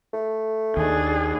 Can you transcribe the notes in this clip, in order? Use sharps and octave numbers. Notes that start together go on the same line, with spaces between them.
A3
D#2 D4 G#4